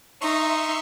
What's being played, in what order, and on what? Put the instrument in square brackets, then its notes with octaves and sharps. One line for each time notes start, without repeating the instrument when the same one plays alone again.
[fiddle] D#4 [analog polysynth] E5 C6 C#6